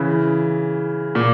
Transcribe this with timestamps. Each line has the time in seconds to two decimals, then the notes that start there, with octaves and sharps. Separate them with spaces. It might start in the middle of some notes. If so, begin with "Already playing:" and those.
Already playing: C#3 E3
1.15 A#2